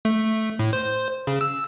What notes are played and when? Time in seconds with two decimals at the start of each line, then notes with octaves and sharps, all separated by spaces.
0.05 A3
0.59 A2
0.73 C5
1.27 C#3
1.41 E6